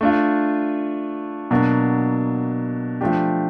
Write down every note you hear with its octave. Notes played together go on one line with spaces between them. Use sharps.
A3 D4 F4
B2 F#3 A#3 D4
F3 A3 D4 G4